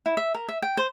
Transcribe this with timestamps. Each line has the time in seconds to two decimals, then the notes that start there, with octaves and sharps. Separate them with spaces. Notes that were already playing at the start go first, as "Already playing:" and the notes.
0.06 E4
0.17 E5
0.34 A#4
0.49 E5
0.62 G5
0.77 C5